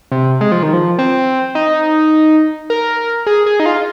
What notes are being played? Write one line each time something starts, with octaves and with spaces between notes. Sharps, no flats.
C3
G#3
F3
D#3
F3
C4
D#4
A#4
G#4
G#4
D#4
F4